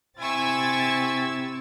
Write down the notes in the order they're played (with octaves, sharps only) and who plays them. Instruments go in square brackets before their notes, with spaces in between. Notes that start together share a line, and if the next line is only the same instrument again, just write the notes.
[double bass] C3 C4 [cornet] E4 [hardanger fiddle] G#5 C#6 [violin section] E6 G#6 A6